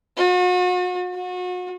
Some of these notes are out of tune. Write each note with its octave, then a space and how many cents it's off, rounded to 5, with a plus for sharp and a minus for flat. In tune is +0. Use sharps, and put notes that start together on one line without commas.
F#4 -40
F#4 -35